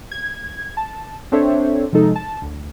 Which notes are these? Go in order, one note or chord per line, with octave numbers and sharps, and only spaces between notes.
G#6
A5
C4 D4 A4 C5 C#5 E5
C3 F3 G#3 D#4 A4
A5
D2